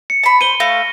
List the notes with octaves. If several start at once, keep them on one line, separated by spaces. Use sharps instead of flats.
C#7
A5 B5
C5 D#7 G7
A3 F5 A#6